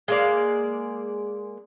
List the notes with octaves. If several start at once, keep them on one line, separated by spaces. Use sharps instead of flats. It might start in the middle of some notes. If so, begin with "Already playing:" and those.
G#3 A#3 D5